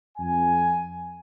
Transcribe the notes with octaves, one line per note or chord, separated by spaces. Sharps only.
F2 G#5